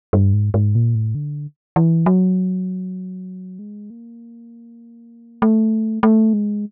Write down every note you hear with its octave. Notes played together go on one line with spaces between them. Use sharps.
G2
G#2
G#2
A#2
A2
D3
E3
F#3
G#3
A#3
A3
A3
G#3